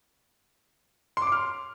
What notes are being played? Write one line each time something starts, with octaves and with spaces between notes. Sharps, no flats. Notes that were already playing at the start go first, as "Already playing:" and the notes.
C6
D6
C6
F6